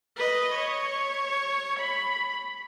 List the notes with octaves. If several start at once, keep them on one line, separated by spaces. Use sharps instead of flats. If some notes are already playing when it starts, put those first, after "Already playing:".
B4 D#5
C#5
B5